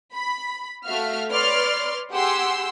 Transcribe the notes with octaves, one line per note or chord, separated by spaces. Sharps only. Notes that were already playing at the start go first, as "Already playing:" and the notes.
B5
A3 F#4 E5 F5 F6
B4 C#5 D5 C6 F6
G4 G#4 F#5 C6 E6